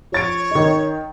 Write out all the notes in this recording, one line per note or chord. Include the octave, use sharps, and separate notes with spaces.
F3 C#5 A6 D7
D#3 D#4